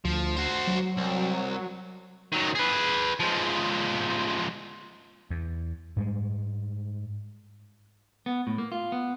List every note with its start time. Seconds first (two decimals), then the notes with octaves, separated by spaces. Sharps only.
0.05 D2 F3
0.36 F#4 C5
0.67 F#3
0.97 C2
2.32 D#3 F#3
2.55 G#4 B4
3.20 F3 G#3
5.30 E2
5.96 G#2 G3 G#3
8.26 B3
8.47 A2
8.58 A#3
8.72 F4
8.92 B3